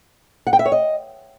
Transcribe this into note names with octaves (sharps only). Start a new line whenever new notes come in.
F#5
G5
E5
C#5
D#5